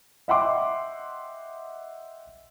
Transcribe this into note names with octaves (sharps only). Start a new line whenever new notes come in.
D#5 E5 F#5 G5 C6 D6